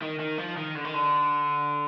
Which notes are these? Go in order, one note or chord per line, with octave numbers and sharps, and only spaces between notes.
D#3
D#3
F3
D#3
D3
D#3
D3